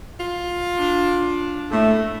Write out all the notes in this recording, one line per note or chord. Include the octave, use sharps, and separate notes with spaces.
F4
D4
A2 A3